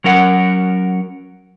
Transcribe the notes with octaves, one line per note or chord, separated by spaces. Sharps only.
F#3 C#4 A#4 F#5